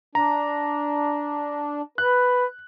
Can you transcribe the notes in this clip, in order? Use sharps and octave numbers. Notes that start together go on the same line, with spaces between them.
D4 A#5
B4 F#6